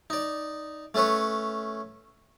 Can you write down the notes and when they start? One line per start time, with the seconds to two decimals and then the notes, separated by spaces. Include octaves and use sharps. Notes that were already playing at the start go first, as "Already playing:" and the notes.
0.10 D#4 D5
0.94 A3 C#4 A4 B4 C#5